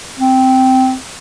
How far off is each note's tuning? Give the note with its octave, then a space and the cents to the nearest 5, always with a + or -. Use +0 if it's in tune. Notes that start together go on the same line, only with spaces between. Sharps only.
C4 -10